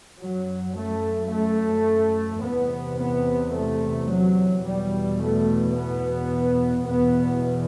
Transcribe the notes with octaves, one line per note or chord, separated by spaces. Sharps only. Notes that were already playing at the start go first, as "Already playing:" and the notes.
F#2 F#3
A3
A3
E2 C3 B3
B3
A3
F#3
E2 B2 G3
A3
B3
E2 B2 B3